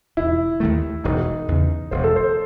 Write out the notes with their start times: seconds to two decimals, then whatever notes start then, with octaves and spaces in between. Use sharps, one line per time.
0.17 E1 E4
0.60 D#2 D#3 A3
1.04 E1 D#4
1.48 E2 C#3
1.91 E1 C5
2.04 A4
2.16 C5